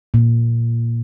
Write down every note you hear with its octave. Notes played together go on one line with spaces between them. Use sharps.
A#2